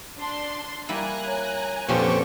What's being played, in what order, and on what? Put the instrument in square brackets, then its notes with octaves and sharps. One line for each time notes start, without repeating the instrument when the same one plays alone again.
[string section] D4 C6
[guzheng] G3 A#3 E4 [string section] G#5 A#5 F#6
[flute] C#5
[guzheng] F2 C#4 [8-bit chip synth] A#2 G4 C5 [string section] D3 C#6 [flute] B4